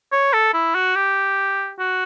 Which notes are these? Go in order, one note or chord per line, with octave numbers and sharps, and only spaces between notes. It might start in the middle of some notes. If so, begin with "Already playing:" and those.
C#5
A4
E4
F#4
G4
F#4